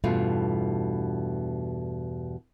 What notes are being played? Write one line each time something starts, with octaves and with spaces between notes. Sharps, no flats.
E2 G2 B2 A3 F4